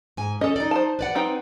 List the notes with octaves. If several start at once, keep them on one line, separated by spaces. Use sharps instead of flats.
G#2 G#5
C#4 A4 D#5
D#4 D5
C5 A5
B4 D5 F#5
C4 D#4 G5